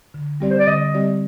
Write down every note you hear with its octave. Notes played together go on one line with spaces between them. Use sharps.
D3
G3 C4 G4 D5
C5
D5
D3 D#5
G3 C4 G4 D5